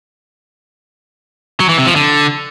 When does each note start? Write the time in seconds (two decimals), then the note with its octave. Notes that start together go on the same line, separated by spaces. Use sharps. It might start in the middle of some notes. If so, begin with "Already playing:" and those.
1.60 F#3
1.69 E3
1.78 C3
1.87 F3
1.96 D3